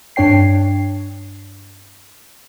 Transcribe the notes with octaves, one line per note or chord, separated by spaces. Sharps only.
G2 D4 C#5 G5 C7